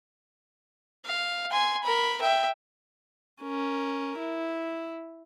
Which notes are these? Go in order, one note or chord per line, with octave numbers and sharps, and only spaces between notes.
F5
G#5 C6
A#4 B5
E5 G5
C#4 A#4
E4